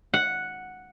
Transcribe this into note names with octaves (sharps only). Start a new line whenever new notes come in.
F#5